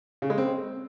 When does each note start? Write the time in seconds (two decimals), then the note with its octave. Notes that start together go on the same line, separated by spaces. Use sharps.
0.22 C#3
0.30 G#3
0.38 C4